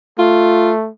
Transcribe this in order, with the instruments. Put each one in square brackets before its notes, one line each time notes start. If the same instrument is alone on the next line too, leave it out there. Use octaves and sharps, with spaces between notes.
[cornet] A3 [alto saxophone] F4